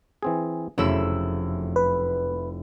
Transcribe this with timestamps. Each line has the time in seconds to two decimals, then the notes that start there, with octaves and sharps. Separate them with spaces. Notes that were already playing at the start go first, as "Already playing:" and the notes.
0.23 E3 C4 G#4
0.78 F1 F#2 C#3 A3 E4 E6
1.76 B4